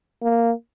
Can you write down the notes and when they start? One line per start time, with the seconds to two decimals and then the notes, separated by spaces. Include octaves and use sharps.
0.23 A#3